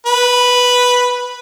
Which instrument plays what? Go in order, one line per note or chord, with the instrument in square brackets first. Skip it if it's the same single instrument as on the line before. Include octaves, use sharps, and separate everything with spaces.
[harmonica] B4